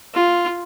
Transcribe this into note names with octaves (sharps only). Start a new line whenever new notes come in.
F4